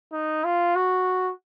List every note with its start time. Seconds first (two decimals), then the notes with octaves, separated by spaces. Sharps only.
0.13 D#4
0.44 F4
0.76 F#4